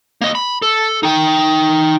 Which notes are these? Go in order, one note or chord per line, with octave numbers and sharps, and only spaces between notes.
A#3 D#5
B5
A4
D#4 G5